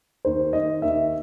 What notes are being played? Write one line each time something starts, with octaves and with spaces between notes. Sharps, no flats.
D#2 C5
D#3 D#5
D#2 E5